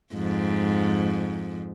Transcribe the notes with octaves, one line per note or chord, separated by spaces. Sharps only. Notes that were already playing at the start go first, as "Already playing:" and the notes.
F2 G#2